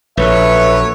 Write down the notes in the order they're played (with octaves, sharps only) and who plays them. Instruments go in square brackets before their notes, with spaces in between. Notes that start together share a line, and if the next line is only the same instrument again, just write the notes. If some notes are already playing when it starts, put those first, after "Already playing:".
[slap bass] A#1 [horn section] F#3 A4 C#5 [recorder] B4 [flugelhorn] E5